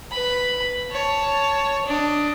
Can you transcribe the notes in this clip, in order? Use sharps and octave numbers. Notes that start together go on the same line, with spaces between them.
B4 B5
C#5 A5
D4 D#5